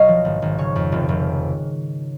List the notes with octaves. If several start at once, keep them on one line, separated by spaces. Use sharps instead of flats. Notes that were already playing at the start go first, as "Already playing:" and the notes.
Already playing: B1 C#5 D#5 F5
F3
G#1
G#1
C#3 C#5
F2
F1
F1